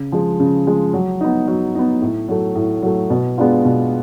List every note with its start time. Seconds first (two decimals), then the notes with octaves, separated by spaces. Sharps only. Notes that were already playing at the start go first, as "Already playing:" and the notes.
Already playing: C#3
0.12 F3 G#3
0.40 C#3
0.67 F3 G#3
0.94 F#3
1.21 B3 D#4
1.48 F#3
1.75 B3 D#4
2.01 A2
2.28 F#3 A3
2.55 A2
2.82 F#3 A3
3.10 B2
3.38 G#3 B3 D4 F4
3.65 B2